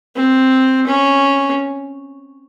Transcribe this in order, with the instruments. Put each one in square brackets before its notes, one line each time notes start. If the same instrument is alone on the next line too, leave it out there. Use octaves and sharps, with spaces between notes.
[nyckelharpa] C4
C#4